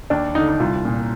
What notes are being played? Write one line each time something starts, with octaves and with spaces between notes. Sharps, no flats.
D#2 D4
D3 D#4
D#4
C2 F4
A#2